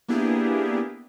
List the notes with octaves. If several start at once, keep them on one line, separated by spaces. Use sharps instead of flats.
A#3 B3 D4 E4 G4 G#4